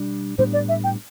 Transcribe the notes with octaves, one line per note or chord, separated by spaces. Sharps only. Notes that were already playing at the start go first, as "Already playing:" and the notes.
Already playing: B2 G3 D4
A2 G3 B3 D4 C5
D5
E5
G5